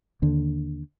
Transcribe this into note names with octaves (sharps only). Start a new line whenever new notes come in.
D#2 D3